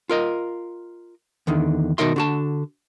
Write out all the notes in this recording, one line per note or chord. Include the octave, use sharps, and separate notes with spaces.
F4 A#4 D#5
E2 D3 D#3
B2 D#3 D#4 A#4 E5 C6
D3 F#4 A5